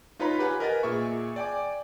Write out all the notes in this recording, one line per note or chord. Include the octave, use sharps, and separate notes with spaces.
D#4 F4 B4 C#5 A#5 B5
G4 B4 F#5 G#5
A#4 B4 D#5 F#5 G#5 A6
A#2 G#4 E5 C#6
D5 G5 G#5 D6